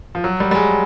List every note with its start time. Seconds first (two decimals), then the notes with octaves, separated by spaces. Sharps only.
0.15 F3
0.24 F#3
0.40 G3
0.51 G3
0.55 G#3